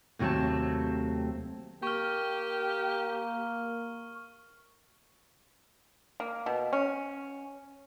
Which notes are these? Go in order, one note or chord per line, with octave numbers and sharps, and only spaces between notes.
D#2 C3 F#3 A3 C4 A5
A#3 G4 C#6 F6
A#3
B2
C#4